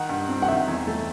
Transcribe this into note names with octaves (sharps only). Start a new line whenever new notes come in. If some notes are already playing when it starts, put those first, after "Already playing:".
Already playing: D#3 F#5
G2
C4
F#5
D#3 E5
E2
A3